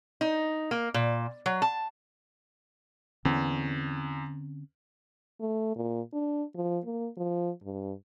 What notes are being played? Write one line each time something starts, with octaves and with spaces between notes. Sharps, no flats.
D#4
A#3
A#2
F#3
A5
E2 D3 C4 C#4
A3
A#2
D4
F3
A#3
F3
G2